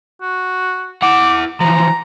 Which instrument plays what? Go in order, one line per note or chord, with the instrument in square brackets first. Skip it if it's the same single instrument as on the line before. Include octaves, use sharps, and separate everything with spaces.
[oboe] F#4
[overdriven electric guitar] E4 F#5 [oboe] D6
[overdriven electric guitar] E3 F3 [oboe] A#5